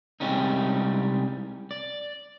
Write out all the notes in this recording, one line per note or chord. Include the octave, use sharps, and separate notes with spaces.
C2 G3 G#3 C4 C#4 D#4
D5